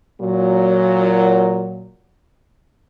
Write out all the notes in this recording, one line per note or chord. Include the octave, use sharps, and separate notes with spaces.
A#2 F#3